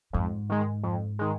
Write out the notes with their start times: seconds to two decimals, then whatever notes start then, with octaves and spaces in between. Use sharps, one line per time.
0.13 F2 G#2
0.50 D#3 G#3
0.83 F2
1.19 D#3 G#3